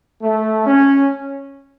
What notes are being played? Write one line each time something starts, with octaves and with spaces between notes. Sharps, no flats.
A3
C#4